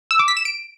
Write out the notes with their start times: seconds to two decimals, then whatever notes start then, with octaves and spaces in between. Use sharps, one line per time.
0.11 E6
0.19 D6
0.28 B6
0.37 E7
0.45 D7